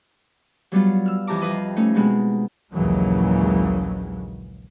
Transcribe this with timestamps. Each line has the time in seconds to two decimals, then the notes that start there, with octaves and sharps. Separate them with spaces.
0.72 F#3 G3 B3 F4
1.06 E6 F6
1.27 F2 E3 G4 A5 A#5 D6
1.41 F2 F4 B4 D#5
1.76 A3 C#4 D#4
1.95 B2 G#3 B3 C4
2.73 A#1 D#2 C#3 E3 F#3 G#3